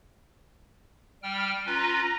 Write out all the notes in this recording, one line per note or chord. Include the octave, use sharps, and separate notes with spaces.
G3 G5 F6
C#4 F4 B4 A#5